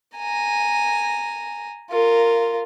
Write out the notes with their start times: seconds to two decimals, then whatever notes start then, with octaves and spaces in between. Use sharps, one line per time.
0.16 G#5 A#5
1.91 F4 A#4